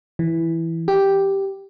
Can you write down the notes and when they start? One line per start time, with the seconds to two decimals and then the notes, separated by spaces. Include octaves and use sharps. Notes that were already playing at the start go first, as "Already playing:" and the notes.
0.19 E3
0.88 G4